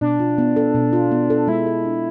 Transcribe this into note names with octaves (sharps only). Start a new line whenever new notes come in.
B2 D4
F4
B3
A4
B2
F4
B3
A4
G#3 E4
A4
D4